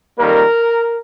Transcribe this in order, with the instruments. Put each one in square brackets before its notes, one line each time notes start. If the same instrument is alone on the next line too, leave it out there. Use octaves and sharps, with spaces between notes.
[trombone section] F2 D#3 G3 A#3 A#4